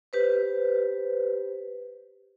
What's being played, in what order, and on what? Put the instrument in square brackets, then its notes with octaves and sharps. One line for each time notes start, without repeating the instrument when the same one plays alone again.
[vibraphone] G4 B4 C5